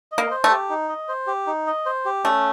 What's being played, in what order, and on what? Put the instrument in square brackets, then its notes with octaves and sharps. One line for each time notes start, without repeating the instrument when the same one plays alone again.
[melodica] D#5
[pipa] A#3
[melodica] C5
[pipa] A3
[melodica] G4
D#4
D#5
C5
G4
D#4
D#5
C5
G4
[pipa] A3 [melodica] C#4